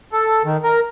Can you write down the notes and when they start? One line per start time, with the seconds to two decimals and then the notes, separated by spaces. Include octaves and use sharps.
0.12 A4
0.45 D#3
0.64 A#4